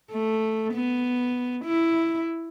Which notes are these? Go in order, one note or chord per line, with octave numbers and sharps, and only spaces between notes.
A3
B3
E4